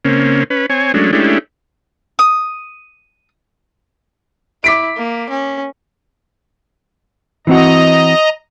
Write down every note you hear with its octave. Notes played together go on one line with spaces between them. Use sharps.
C#3 A#3 C4 C#4
C#4 B4
C4 C#5 G#5
F#3 G#3 A3 C#4 D4
G#3 A3 C#4 D4 E4 G4
D#6
E4 D6 B6 D7
A#3
C#4
E3 C4 F#4 D#5 A#5